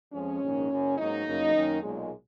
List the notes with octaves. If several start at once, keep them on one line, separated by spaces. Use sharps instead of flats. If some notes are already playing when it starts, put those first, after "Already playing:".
F2 F3 G#3 C#4
A#1 G#2 D#3 A#3
F#1 F#2 C#3
G#2 F#3 A#3 C#4 D#4
F#1 F#2 C#3 F#3 A#3
F#2 D#3 A#3 C#4
B1 A#2 G#3